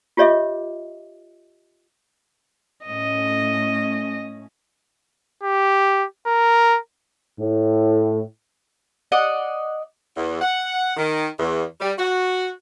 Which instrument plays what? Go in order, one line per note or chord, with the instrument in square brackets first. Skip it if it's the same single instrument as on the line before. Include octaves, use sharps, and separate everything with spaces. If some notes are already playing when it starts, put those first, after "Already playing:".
[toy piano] F4 G4 C#5 D#5 E5 D6
[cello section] A2 A3 C#4 [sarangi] D#5
[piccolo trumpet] G4
A#4
[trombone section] A2
[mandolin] D5 D#5 F#5
[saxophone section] E2
F#5
D#3
E2
G3
F#4